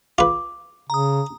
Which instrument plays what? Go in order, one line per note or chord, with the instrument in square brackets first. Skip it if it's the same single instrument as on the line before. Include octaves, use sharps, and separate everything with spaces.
[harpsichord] F4 B4 [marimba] D6
[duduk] C#3 [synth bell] A#5 D#6